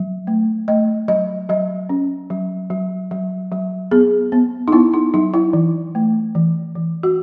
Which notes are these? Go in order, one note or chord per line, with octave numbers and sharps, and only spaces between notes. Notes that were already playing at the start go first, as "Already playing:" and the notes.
Already playing: F#3
A3
A3 D#5
F#3 D#5
F#3 D#5
C#4
F#3
F#3
F#3
F#3
B3 G#4
B3
D#4
B3 E4
D#4
F#3 D#4
E4
E3
A3
E3
E3
F#4